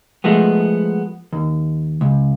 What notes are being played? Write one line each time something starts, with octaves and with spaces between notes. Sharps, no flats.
F3 G#3 A3 B3
D#2
C#2